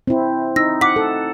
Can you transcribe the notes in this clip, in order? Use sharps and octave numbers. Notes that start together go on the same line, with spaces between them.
C4 E4
D#4 E6 A#6
F#5 D6 B6
A4